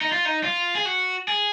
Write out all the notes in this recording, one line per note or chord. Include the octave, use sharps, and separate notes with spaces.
D#4
F4
D#4
F4
G#4
F#4
G#4